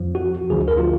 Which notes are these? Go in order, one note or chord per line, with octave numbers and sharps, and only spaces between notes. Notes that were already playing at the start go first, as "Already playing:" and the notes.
Already playing: F2 F3
F#4
D2 D3 F3 G#4
A#4
F4